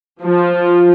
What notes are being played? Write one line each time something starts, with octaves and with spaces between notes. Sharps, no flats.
F3